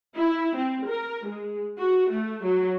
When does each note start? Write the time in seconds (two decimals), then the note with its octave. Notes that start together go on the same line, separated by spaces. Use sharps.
0.15 E4
0.56 C4
0.89 A#4
1.27 G#3
1.78 F#4
2.10 A3
2.44 F#3